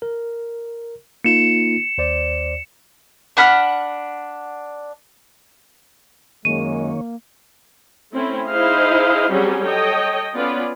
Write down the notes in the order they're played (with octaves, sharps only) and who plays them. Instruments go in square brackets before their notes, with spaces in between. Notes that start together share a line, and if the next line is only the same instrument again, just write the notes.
[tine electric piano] A#4
[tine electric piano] A#3 D#4 F4 [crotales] C#7 E7
[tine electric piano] D#2 C5 D5
[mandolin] D4 F#5 B5 F6
[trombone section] F#2 G#3 [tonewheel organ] D#3 C#5 [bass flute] A#3 [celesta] D#7
[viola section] A3 C4 C#4 E4
D#4 E4 G#4 C5 D#5 F5
F#3 G3 C4 C#4 F#4 G#4
A4 C#5 D#5 G5
B3 C#4 F4 B4 D5